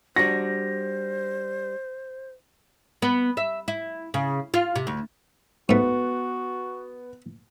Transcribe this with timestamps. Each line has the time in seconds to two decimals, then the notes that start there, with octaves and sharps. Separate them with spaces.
0.16 G3 D4 F#4 C5 A#6
3.02 B3
3.37 E5
3.68 E4
4.14 C#3
4.54 F4
4.76 C3
4.87 D2
5.69 G#2 A3 B3 F#4